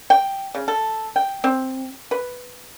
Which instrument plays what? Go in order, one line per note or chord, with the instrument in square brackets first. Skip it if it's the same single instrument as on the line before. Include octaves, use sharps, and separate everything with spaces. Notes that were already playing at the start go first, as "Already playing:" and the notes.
[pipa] G5
C#3
A4
G5
C4
B4